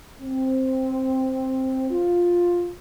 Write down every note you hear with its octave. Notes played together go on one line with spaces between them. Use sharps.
C4
F4